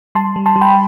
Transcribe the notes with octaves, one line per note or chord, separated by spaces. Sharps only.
G3 A5 C6
G3
A5 C6
G3
G5 B5